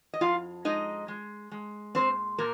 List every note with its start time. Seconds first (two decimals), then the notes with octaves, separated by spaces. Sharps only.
0.14 D#5
0.21 F2 F4 F5
0.65 G#3 D#4 D#5
1.08 G#3
1.51 G#3
1.95 A#2 C4 C5
2.38 A#2 A#3 A#4